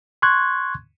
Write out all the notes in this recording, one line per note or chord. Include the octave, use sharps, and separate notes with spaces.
C6 C#6 F#6 G#6